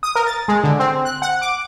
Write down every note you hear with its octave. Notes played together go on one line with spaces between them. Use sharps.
D#6
A#4
A6
G#3
D3
C4
F#6
F#5
D6